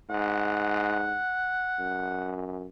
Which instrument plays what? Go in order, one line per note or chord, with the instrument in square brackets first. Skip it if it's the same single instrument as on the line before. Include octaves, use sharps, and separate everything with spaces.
[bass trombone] G#2 [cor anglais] F#5
[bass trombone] F#2